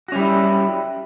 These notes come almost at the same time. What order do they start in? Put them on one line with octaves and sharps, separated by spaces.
F#4 C#4 G3 E4